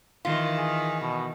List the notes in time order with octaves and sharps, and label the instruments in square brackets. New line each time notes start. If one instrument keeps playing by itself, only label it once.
[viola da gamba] D#3 E3 [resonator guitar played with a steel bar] F4
[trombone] G#4
B2